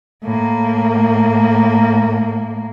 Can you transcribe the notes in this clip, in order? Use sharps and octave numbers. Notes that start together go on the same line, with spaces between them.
A2 A#3